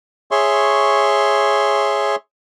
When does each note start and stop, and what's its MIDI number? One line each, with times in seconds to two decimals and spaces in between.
0.31 2.16 68
0.31 2.16 73
0.31 2.16 76
0.31 2.16 84
0.31 2.16 85